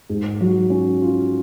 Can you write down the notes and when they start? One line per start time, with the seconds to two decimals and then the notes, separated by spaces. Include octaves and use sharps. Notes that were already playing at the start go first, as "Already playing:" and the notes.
0.10 G#2
0.41 F#3
0.70 C#4
1.01 F4